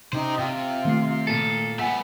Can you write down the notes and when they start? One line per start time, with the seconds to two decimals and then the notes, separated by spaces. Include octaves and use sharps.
0.13 C3 C#4 D#4 G4 C5
0.39 C3 F4 G5
0.85 D#3 A3 C7
1.27 A#2 A4
1.79 A3 B3 F#5 G#5 B6